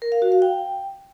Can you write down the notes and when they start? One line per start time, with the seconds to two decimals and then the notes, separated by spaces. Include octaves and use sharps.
0.02 A#4
0.12 F5
0.22 F#4
0.32 F5
0.42 G5